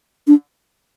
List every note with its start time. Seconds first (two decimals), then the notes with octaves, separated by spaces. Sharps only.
0.27 D4